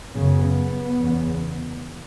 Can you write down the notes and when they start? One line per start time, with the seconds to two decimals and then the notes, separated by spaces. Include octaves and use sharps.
0.13 F#2 C#3 B3
0.98 E2 C#3